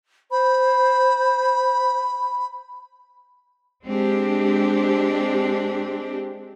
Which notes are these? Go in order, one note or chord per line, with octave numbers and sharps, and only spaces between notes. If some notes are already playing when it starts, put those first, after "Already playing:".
C5 B5
G#3 C4 D4 G4